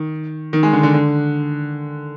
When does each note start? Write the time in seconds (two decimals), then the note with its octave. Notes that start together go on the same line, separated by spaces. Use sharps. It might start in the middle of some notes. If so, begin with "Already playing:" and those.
Already playing: D#3
0.53 D#3
0.63 G#3
0.73 D3
0.83 D3
0.94 D3